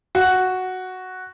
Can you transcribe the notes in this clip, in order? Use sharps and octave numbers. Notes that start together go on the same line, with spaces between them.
F#4